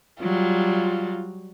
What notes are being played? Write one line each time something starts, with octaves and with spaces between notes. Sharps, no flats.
F#3 G3 F4